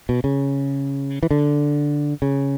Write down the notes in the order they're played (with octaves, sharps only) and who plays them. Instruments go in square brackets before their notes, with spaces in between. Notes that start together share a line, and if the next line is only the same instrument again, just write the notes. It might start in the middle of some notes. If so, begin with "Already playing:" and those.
[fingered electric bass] B2
C#3
E3
D3
C#3